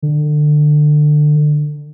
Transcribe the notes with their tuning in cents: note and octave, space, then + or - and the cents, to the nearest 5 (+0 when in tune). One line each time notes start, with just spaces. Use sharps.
D3 +25